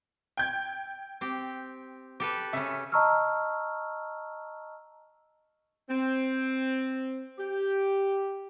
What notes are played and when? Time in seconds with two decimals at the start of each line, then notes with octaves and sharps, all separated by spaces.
0.37 G5 G6 G#6
1.21 C4 G4
2.20 G4 A4 B4
2.53 C#3 C#4 E5
2.92 D#5 A5 A#5 C#6 E6 F6
5.90 C4
7.39 G4